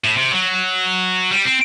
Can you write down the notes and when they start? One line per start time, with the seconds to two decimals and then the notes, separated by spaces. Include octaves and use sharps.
0.04 A2
0.17 C3
0.32 F#3
1.31 G3
1.45 C4